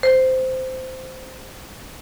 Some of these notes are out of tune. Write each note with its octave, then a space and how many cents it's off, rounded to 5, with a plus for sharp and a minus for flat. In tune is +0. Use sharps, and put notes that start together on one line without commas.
C5 -10